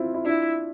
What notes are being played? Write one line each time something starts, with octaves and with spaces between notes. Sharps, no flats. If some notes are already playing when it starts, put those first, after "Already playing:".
Already playing: C4 E4 F4
E4
D4 E4 F4